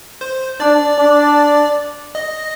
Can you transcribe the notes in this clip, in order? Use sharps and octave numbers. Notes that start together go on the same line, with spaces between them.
C5
D4 D5
D4
D#5